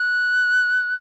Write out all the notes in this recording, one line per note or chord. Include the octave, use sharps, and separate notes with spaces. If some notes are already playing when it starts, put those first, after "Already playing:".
Already playing: F#6